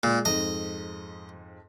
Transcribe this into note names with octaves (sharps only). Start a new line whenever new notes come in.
A#2 G#3
F2 G#2 D#5